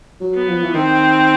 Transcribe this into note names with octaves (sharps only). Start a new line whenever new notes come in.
F#3
B3
F3
E3
D#3 C4